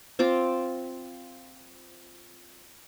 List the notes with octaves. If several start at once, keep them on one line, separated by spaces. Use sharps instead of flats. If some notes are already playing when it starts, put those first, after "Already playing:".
C4 F4 D6